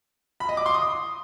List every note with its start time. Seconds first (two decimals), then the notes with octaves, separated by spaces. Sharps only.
0.40 B5
0.49 D#5
0.57 D6
0.66 C6
0.74 D#6